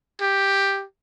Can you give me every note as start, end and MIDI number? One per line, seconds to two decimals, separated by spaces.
0.21 0.84 67